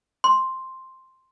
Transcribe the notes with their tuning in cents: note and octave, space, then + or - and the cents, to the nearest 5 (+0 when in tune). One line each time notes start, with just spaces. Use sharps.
C6 +5